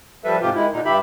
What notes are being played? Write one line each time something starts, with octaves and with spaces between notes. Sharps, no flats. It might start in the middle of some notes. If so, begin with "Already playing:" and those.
F3 G3 A4 B4 E5
G#2 C3 F4 G4
D#3 G#3 E4
A#2 D3 D#4
G2 G4 E5 B5